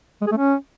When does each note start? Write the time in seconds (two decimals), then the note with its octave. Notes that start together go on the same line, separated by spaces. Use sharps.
0.22 G#3
0.27 G#4
0.32 A3
0.37 C#4